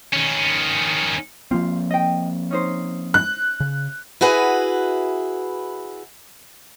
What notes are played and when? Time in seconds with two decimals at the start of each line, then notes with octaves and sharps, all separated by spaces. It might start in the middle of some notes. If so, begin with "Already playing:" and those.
0.13 D#3 C#4
1.51 F3 A#3 C4 F4
1.91 D#5 G5
2.51 C#4 D#4 C5
3.14 F#6
3.60 C#3
4.21 E4 F#4 G#4 B4